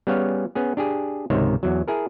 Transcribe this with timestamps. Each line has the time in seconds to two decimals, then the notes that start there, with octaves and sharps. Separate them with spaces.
0.07 G3 B3 C#4 G#4 C#5 F5
0.55 B3 C#4 G#4
0.77 D4 G4 G#4
1.30 C#2 G#2 C3 D#3 C#5 E5
1.63 E2 F#3
1.88 E4 G#4 A#4